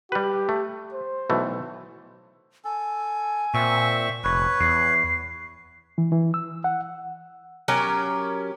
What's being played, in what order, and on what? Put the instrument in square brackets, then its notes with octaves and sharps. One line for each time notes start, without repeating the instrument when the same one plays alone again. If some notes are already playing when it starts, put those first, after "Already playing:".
[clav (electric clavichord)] G3 B4 [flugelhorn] G4
[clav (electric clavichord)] A3
[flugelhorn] C5
[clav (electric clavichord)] B1 E3 A3
[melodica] A4 [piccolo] G#5
[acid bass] A#2 [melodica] C4 E5 C#6
[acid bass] F1 [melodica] B4 C#5
[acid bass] E2 [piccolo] C7
[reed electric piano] E3
E3
E6
F#5
[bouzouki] F#3 C#4 G4 A#4